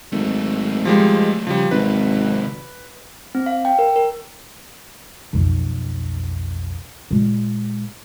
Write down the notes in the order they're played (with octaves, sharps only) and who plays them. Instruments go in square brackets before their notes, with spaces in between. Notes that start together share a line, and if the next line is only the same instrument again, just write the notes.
[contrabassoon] G#1 [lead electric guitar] F#3 A3
[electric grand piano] F3 G3 G#3
[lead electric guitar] C#3 [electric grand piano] F3 G3
[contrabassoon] G#1 [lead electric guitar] C3 F#3 [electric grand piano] B4
[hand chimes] C4
F5
G5
A#4
A#4
[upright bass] B1 F2
A#2 G#3